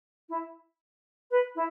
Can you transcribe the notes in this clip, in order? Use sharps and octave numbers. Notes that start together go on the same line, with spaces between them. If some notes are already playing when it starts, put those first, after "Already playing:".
E4
B4
E4